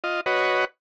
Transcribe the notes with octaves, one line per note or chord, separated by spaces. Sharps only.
F4 D#5
F#4 B4 C#5 D#5